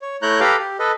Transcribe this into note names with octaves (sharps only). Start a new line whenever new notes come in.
C#5
A3 E4 C#5 A#5 F#6 G6
G4 A4 B4 F5 A#5 D6
G4
A4 B4 D#5